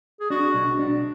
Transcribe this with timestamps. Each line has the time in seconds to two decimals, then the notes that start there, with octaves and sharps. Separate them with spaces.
0.20 G#4
0.30 D4 F#4
0.54 B1
0.79 D4